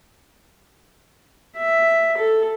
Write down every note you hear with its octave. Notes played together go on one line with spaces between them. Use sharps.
E5
A4